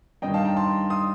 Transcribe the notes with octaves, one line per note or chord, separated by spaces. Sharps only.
G2 D#3 D#5 G5
F5 A5
G5 A#5
A5 C6
C6 D#6